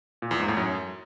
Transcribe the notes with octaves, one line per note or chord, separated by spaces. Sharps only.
A#2
E2
G#2
A2
F#2